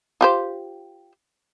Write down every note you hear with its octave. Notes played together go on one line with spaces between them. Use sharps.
F4 G4 C5